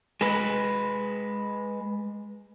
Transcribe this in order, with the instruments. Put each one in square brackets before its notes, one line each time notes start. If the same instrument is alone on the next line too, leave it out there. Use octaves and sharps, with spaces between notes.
[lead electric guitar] G#3 B4